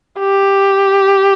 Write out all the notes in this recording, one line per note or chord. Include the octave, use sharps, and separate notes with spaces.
G4